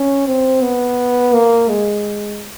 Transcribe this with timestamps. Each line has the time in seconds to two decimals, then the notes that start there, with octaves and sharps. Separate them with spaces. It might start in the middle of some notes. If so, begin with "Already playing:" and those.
Already playing: C#4
0.26 C4
0.62 B3
1.33 A#3
1.69 G#3